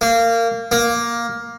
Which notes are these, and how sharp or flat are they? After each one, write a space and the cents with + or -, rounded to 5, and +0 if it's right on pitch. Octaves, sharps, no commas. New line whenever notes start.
A#3 -20
A#3 +10